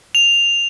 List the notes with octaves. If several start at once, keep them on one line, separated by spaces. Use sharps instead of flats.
F7